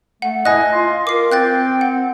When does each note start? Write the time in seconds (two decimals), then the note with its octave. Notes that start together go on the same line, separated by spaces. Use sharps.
0.22 A3 F#5
0.45 E4 D#5 G#5 F#6 A#6
0.73 F4 C6
1.07 F4 A#4 D6 C7
1.32 C4 G5 F#6 G6 A6
1.81 F#5